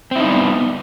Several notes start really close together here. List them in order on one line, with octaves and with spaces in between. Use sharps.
C4 E4 D#4 G3 B3